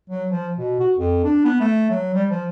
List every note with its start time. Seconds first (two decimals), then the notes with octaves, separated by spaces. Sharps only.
0.10 F#3
0.30 F3
0.58 B2
0.80 F#4
0.97 F2
1.24 D4
1.45 B3
1.60 A3
1.90 F#3
2.14 G3
2.31 F3